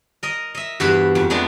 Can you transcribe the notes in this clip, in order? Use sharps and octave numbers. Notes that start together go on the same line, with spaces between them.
A#4 D#5
D#5 E5
E2 G2 F#4 B4 C5 B5
F2
G#3 A3 B3 D4